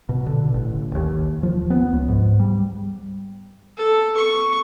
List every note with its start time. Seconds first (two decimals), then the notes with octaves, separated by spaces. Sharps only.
0.09 B2
0.26 D3
0.54 A1
0.95 D#2
1.43 F3
1.70 B3
1.93 C#2
2.08 G#2
2.40 G3
3.77 A4
4.17 C#6